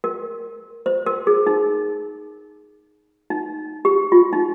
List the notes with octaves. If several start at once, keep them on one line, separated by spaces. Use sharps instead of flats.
A#4
C5
A#4
G#4
D#4
D#4
G4
F4
D#4